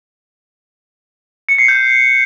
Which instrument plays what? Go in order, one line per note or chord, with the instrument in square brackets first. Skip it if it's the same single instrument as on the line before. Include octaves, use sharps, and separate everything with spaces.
[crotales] C#7
C7
G6